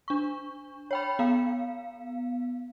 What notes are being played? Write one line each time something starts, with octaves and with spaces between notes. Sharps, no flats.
D4 C#6
C#5 G5 B5
B3 F5